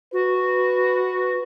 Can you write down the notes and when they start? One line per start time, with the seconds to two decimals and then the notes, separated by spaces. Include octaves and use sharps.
0.13 F#4 B4